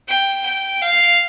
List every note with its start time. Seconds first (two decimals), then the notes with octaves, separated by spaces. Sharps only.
0.08 G5
0.45 G5
0.82 F5